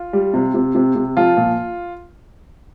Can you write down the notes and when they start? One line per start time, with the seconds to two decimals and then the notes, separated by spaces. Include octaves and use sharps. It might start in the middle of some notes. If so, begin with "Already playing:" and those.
Already playing: F4
0.13 G3
0.34 C3
0.54 C3
0.75 C3
0.95 C3
1.17 F3 F4
1.37 A#2